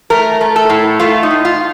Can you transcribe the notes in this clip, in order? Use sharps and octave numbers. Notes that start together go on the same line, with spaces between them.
A3 A#4
A3
A4
A2
A3 F4
D#4
A2
F4